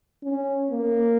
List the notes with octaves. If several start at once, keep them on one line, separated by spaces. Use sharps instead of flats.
C#4
A#3